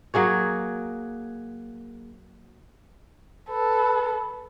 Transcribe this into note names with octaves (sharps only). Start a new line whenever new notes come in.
F#3 A#3 G#4 C#5
A4 B4